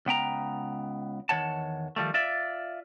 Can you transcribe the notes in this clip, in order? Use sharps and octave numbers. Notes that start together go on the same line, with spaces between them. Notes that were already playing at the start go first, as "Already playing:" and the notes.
C#2 B3 G5 A#5
E2 G2 D#3 C#5 F#5 A5
D#3 F3 G3 A3
F4 D5 E5